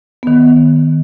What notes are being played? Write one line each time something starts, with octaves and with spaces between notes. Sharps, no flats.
D#3 B3